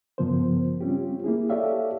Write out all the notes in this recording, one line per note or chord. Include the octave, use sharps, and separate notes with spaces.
G2 C#3 F3 B3 A#4 C5
G3 C4 C#4 F4 G4
A#3 E4 G#4
G4 A4 C#5 D5 E5 F5